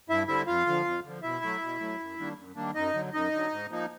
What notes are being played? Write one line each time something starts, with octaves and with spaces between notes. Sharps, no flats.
G2 E4 E5
D3 G3 C4 E4 E5
F2 F4 F5
D3 F3
F2
D3 F3
B2 E4 E5
F#3 A3
B2
F#3 A3
F#2
D#3 G3 A#3 D4
F#2
D#3 G3 A#3 D4
F#2 D#4 D#5
D3 F#3
F#2 D#4 D#5
D3 F#3
G#2
F3 A#3 D#4